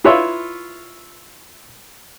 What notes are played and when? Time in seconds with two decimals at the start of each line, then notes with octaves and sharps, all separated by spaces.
0.04 E4 F4 B4 C#5 E5 C6